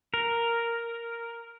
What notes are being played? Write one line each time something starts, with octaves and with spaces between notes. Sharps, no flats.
A#4